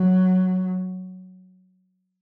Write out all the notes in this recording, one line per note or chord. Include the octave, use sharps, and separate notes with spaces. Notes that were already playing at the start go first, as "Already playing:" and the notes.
Already playing: F#3